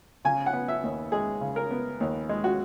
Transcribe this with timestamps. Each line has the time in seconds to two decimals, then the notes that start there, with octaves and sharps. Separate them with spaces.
0.25 C#3 G#5
0.46 F#5
0.53 B3
0.68 E5
0.83 D#2
1.12 G#3 G#4
1.41 C#3
1.56 A#4
1.71 B3
2.00 D#2
2.29 G#3
2.44 F#4